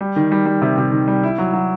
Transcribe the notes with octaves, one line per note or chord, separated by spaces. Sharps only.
G3
D#3
G3
G3
C3
C3
D#3
G3
E4
F#3
F#3